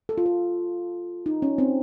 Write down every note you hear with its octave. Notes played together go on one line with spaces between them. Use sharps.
A4
F4
A4
D#4
C#4
C4